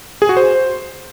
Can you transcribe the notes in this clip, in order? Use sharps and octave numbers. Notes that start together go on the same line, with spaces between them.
G#4
F#4
C5